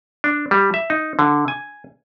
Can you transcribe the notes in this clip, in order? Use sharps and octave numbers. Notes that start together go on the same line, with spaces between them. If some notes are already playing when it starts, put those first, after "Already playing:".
D4
G3
E5
D#4
D3
G#5